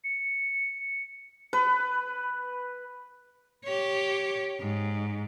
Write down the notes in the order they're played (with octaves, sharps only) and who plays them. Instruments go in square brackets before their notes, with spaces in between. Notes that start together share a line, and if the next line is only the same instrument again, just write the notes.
[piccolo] C#7
[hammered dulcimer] B4
[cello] G4 C#5
G#2